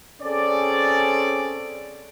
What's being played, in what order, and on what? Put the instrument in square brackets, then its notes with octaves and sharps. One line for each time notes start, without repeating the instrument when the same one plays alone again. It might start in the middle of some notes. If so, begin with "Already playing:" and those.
[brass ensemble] C4 C#4 G#4 A4 D5